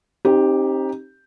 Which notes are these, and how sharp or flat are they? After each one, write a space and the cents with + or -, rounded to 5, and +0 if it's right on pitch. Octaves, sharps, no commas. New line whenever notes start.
C4 +40 D#4 +5 G4 +0